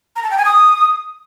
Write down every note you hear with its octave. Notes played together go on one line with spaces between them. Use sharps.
A#5
A5
G5
G#5
D#6